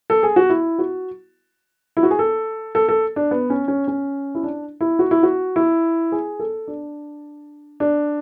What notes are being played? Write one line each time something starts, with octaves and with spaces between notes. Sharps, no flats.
A4
G#4
F#4
E4
F#4
E4
F#4
G#4
A4
A4
A4
D4
B3
C#4
C#4
C#4
E4
D4
E4
F#4
E4
F#4
E4
G#4
A4
D4
D4